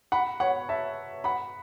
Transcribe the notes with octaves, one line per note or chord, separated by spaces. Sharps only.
F#5 B5
C#5 F#5
E5 A5
F#5 B5